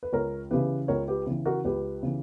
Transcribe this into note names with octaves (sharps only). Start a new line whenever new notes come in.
B4
C#2 A#4 C#5
C#3 E3 G4 B4
C#2 A#4 C#5
G4 B4
C#3 E3
F#4 A#4
C#2 G4 B4
C#3 E3